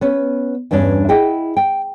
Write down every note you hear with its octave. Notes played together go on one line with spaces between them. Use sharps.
B3 C#4 B4
E2 G2 G3 C#4 D4
E4 G#4 D#5 F#5 G5
G5